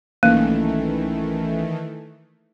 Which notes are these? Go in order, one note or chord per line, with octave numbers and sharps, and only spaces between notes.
B1 D#3 E3 A3 A#3 C#4 F#6